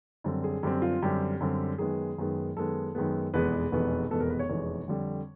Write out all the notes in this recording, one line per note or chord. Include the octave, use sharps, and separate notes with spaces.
F#2 D3 G3 C4
G#4
F#2 D3 G3 C4 G4
F4
F#2 D3 G3 C4 G4
F#2 D3 G3 C4
F#2 D#3 G#3 B3 G#4
F#2 D#3 G#3 B3
F#2 D#3 G#3 B3 A4
F#2 D#3 G#3 B3
F1 E2 B2 G#3 B3 B4
F1 E2 B2 G#3 B3
F1 E2 B2 G#3 B3 A4
A#4
B4
C#5
F1 E2 B2 G#3 B3 C#5
F2 D3 G3